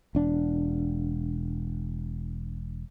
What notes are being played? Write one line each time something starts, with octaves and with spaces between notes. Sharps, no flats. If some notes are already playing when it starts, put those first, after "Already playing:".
E1 D4